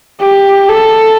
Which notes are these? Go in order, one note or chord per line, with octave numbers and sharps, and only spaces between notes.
G4
A4